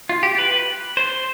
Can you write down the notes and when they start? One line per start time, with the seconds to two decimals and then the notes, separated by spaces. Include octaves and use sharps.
0.09 F4
0.23 G4
0.38 B4
0.97 C5